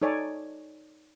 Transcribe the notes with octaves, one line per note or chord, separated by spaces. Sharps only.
D#4 A4 C#5 D5 G#5